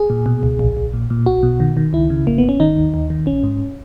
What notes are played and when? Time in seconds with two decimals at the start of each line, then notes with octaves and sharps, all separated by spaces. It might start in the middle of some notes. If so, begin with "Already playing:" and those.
Already playing: G#4
0.10 A#2
0.26 B2
0.43 C#2
0.59 A#1
0.77 A#1
0.93 A#2
1.10 A#2
1.26 B1 F#4
1.43 B2
1.60 D#3
1.77 D#3
1.93 C#2 E4
2.10 C#3
2.27 G#1 A#3
2.38 B3
2.44 G#1 C#4
2.60 D#3 D#4
2.76 D#2
2.94 D#2
3.10 D#3
3.26 A#1 C#4
3.43 G#2